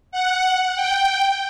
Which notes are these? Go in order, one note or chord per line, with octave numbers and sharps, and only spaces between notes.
F#5
G5